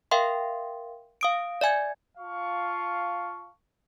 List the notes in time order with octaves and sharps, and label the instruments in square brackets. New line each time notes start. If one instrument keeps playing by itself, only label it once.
[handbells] A#4 E5 F5 G5 C6
F5 D#6 D7
D5 E5 G#5 G#6
[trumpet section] F4 F5 A5 C#6